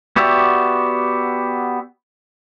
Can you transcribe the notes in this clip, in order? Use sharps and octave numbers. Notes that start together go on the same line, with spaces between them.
B3 F#4 G4 D5 E5